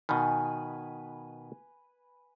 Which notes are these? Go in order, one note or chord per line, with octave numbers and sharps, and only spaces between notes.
B2 D#3 B4 G#5